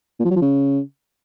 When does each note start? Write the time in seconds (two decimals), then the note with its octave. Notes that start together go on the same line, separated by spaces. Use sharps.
0.19 A#2
0.25 F3
0.30 F#3
0.36 F3
0.42 C#3